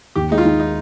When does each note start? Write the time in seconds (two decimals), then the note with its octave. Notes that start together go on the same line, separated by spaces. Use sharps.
0.16 D#2 G4
0.31 G#3 D#4
0.38 F4
0.45 D#3
0.60 D#4